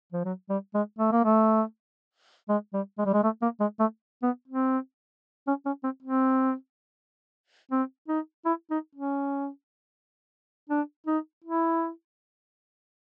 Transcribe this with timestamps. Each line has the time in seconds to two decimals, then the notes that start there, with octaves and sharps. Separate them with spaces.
0.12 F3
0.25 F#3
0.49 G3
0.74 G#3
0.99 A3
1.12 A#3
1.25 A3
2.49 G#3
2.73 G3
2.98 G#3
3.05 G3
3.13 G#3
3.23 A3
3.42 A#3
3.60 G#3
3.80 A3
4.23 B3
4.48 C4
5.47 C#4
5.66 C#4
5.84 C4
6.02 C4
7.71 C4
8.08 D#4
8.45 E4
8.70 D#4
8.95 C#4
10.70 D4
11.07 D#4
11.44 E4